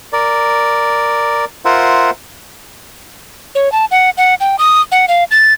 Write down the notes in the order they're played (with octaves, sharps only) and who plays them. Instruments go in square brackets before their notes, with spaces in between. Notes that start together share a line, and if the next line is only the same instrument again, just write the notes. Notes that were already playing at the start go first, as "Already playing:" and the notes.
[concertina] A#4 D5
F4 A#4 C5 E5 F#5
[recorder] C#5
A5
F#5
F#5
G5
D#6
F#5
F5
A6